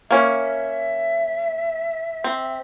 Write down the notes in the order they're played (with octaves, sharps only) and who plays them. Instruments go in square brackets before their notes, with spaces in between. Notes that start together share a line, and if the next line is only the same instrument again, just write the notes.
[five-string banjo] A#3 C#4 [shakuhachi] E5
[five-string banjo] C4